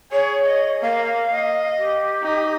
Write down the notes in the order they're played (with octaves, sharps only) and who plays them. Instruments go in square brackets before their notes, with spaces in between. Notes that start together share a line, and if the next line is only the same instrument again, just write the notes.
[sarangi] G#4 [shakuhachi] C#5
[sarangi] D#5
[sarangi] A#3 [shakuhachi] F5
[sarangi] D#5
[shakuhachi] G4
[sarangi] D#4